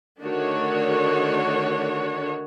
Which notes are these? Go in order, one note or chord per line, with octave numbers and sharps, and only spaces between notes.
D3 D#3 A3 D4 F#4 C#5